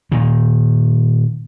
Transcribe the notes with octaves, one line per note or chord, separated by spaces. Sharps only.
A#2 D#3